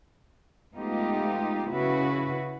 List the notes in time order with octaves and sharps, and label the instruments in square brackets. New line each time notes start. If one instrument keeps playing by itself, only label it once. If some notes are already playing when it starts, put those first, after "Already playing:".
[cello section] G#3 A3 B3 D#4 F4 G4
C#3 E4 F#4 B4